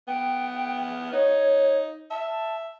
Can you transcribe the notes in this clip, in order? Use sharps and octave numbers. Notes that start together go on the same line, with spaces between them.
B3 G5
D#4 C#5
E5 A5